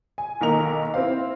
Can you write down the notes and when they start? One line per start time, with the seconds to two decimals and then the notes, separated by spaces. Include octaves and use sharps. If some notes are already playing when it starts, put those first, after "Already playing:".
0.18 G#5
0.41 B1 D#3 A#3 A#4 D#5 F7
0.94 C4 E4 C5 F5